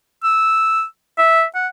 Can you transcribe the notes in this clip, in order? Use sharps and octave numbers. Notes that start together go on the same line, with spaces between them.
E6
E5
F#5